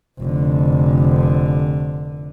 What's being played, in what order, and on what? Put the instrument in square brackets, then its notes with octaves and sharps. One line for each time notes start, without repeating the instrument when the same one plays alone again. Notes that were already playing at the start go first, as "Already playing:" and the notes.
[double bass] F1 D3